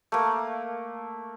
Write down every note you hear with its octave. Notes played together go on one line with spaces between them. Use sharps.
A3 A#3